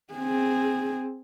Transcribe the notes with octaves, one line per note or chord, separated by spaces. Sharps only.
C4 G#4